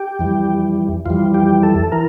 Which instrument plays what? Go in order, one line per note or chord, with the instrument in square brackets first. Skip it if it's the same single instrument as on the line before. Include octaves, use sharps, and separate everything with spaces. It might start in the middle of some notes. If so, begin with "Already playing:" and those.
Already playing: [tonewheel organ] G4
F2 E3 G3
F2 E3 G3 F4
G4
A4
E3 A#4